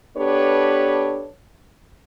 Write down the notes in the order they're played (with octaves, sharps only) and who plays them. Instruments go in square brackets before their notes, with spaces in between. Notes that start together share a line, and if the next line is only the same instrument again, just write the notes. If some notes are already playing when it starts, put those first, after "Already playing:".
[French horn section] B3 D4 G4 A4 B4 C#5